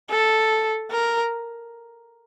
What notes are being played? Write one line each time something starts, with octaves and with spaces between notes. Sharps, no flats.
A4
A#4